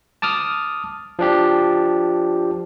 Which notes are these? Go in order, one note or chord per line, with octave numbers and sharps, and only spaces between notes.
A5 D6 D#6 F6
F3 D4 G4